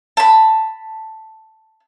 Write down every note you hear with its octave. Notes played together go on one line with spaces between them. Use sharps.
A5 B5